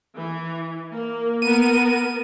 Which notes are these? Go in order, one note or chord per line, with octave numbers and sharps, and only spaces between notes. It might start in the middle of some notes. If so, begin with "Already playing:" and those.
E3
A#3
B3 A#4 D#7